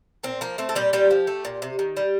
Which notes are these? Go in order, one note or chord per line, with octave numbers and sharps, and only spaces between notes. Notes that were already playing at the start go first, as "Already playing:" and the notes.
A#2 C4
F3 A#3
A3 C4
A4
A#2 G3 G4
A#2 G3 G4
F3
A3
A#2
C3
D#3
G3